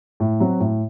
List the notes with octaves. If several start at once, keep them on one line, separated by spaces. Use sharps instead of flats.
A2
F#3 C4 F#4
A2